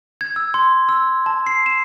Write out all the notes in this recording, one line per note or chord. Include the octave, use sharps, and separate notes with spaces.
G#6
E6
C6
E6
A5
C7
E7